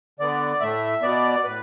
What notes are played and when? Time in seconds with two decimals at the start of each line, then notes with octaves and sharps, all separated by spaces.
0.19 D3 B3 D5
0.61 A2 A3 E5
1.02 B2 B3 D5
1.44 A2 B4